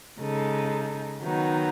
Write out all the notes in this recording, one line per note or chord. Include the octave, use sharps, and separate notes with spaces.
C#3 G#3 D#4 A4
D#3 F#3 B3 D#4